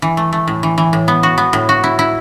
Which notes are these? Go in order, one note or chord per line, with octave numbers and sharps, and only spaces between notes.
E3
A3
A3
A2
E3
E3
A2
B3
F#4
B3
A2
F#4
E4
E4